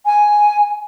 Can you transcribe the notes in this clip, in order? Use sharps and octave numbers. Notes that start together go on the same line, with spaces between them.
G#5